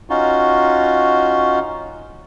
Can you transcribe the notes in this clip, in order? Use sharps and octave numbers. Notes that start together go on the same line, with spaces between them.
C#4 D#4 F4 F#4